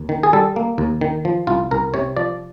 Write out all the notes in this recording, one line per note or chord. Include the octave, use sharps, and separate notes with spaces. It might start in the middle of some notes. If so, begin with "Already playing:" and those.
Already playing: D#2
D#3
G#4
G3 A4
A#3
D#2
D#3
F3
C2 F4
C2 A#4
C3 C#5
F3 D5